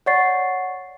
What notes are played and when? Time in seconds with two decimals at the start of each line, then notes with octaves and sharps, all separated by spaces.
0.06 C#5 D5 F#5 C#6 A6 C7